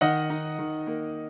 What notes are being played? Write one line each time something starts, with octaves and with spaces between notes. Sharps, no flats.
D#3 D#5 F#5
D#4
D#3
A#3